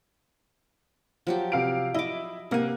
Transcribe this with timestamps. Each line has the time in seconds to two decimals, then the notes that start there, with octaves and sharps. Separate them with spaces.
1.27 F3 F#3 G4
1.52 C3 F5 D7
1.94 E4 D#5 D6
2.51 C3 A#3 F#5 G#5